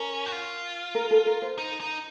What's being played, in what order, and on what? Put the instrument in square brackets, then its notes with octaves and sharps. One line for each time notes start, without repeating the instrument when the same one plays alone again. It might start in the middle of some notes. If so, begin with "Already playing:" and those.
Already playing: [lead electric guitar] C#4 [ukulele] A#4
[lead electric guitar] F#4
F4
[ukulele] A#4
A4
A#4
C5
[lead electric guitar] D#4
D#4